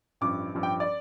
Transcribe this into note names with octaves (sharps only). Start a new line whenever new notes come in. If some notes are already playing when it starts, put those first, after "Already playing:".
A1 G2 F3 D6
A1 G2 F3
G5
D5